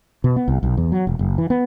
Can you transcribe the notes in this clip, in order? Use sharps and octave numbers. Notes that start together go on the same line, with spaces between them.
B2
B3
C2
B1
E2
F#3
E1
F#1
E3
B3